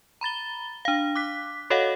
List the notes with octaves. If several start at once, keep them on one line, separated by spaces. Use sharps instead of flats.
A#5 B5 A6 G7
D4 F5
D6 F#6 B6
F#4 A4 C#5 D#5 F5 F#5